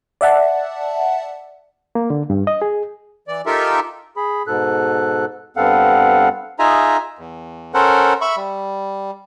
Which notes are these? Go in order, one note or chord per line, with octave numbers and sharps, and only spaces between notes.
D5 E5 F#5 A5
A#3
D3
G2
D#5
G#4
E3 D5
D#4 F4 G4 A4 A#4 E5
G#4 B5
G#2 B2 A4 F#6
G2 B3 C4 A4 F5 F#5
D#4 F4 G#4 E5 G#5 A#5
E2
C#4 A4 A#4 C5 F#5
E5 B5 C#6
G3